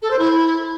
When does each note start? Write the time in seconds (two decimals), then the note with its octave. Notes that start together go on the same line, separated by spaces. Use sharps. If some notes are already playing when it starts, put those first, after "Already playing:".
0.02 A4
0.10 C5
0.19 E4